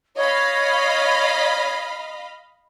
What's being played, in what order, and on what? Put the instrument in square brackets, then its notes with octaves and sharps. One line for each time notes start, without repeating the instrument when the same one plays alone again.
[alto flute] C#5 [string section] D#5 F5 B5